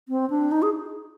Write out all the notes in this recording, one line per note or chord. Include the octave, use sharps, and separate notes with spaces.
C4
D4
D#4
G#4